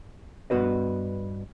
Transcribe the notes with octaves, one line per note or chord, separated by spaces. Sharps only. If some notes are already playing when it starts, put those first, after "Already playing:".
G2 C3 B3 F#4 B4 D#5